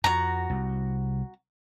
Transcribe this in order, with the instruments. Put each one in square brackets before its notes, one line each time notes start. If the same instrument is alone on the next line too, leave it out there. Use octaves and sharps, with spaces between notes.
[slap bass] F2 [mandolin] F#4 A#5
[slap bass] C2